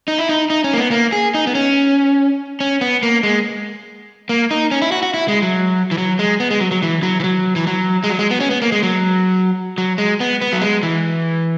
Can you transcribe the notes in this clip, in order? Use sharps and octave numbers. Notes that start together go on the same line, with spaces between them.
D#4
E4
D#4
D#4
C#4
A#3
B3
A#3
G#4
D#4
B3
C#4
C#4
B3
A#3
G#3
A#3
D#4
C#4
E4
F#4
F#4
E4
G#3
F#3
E3
F#3
G#3
B3
G#3
F#3
F#3
E3
F#3
E3
F#3
E3
F#3
G#3
F#3
G#3
B3
C#4
B3
A#3
G#3
F#3
F#3
G#3
B3
B3
F#3
G#3
E3